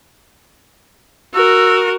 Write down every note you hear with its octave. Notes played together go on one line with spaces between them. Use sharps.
F#4 A#4 E6